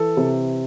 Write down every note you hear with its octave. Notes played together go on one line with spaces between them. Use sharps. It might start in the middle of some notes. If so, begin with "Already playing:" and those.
Already playing: E3 A4
C3